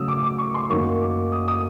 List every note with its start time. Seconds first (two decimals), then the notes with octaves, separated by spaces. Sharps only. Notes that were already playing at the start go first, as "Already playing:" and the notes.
Already playing: C#3 F#3 A3 D#6 E6
0.08 D6
0.23 D6
0.38 C#6
0.54 C6
0.70 F#2 D#3 F#3 A#3 D#4 C#6
1.01 D6
1.32 D#6
1.48 D#6